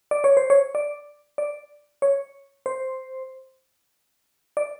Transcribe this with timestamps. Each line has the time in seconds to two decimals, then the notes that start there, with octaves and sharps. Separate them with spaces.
0.11 D5
0.24 C#5
0.37 C5
0.50 C#5
0.75 D5
1.38 D5
2.02 C#5
2.66 C5
4.57 D5